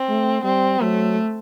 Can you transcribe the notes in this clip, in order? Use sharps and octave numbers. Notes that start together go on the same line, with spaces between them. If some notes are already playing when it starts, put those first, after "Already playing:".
Already playing: C4
A3
G3 C4
F#3 A3